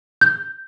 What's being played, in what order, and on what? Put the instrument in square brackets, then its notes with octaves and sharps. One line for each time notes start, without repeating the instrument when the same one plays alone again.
[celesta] G6